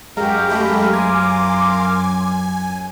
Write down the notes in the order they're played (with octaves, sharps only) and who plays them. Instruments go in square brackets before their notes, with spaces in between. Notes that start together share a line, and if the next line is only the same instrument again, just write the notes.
[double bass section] F#2 F#3 [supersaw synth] G#3 [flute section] F#4 G4 [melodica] A#4 F5 A#5
[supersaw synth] G#3 A3 G4 [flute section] G#5 B5
[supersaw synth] G#5 [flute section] C6 D6